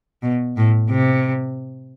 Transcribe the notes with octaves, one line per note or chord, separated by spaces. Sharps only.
B2
A2
C3